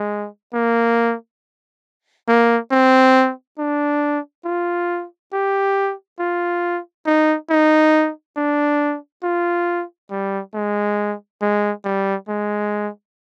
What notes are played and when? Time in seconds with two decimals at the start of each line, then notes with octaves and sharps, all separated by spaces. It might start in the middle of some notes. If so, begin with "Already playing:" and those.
Already playing: G#3
0.54 A#3
2.28 A#3
2.71 C4
3.59 D4
4.45 F4
5.33 G4
6.19 F4
7.06 D#4
7.50 D#4
8.37 D4
9.23 F4
10.11 G3
10.54 G#3
11.42 G#3
11.85 G3
12.28 G#3